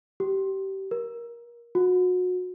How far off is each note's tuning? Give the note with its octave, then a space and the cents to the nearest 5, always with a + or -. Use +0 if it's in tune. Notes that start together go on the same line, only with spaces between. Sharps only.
G4 -25
A#4 +20
F#4 -30